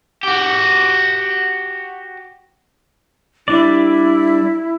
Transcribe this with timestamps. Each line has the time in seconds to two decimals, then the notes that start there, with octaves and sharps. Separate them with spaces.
0.23 F#4 G4
3.48 G3 D4 E4 D5